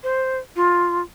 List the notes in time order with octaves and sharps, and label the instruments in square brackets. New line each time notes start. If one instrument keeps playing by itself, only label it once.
[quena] C5
F4